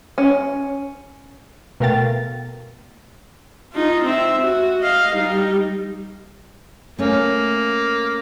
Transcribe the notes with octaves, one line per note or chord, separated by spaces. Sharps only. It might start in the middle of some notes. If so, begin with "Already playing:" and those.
C#4
B2 A3 A#4 F5 G5 A6
D#4 F4
C4 E5
F#4
D#5 F5
G3 D#4
A3 A#3 C#4